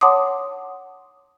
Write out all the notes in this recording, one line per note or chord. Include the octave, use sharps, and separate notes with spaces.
C#5 F#5 A5 C6 D6 D#6